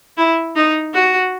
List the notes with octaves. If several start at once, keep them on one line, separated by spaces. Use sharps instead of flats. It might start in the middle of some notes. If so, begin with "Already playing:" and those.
E4
D#4
F#4